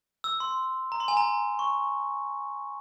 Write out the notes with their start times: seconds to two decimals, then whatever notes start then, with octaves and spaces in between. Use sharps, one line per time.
0.24 E6
0.40 C6
0.92 A#5
1.00 C6
1.08 G#5
1.17 A#5
1.59 C#6